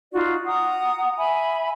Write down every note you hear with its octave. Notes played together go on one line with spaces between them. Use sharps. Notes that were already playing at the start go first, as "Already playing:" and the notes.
D#4 F4 F#4 D5
F#5 A#5 D#6
E5 G#5 B5